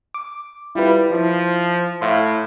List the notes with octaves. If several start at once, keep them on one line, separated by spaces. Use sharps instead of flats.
D6
G3 E4 F4 B4
F3 E4
A2 E5 F5 C6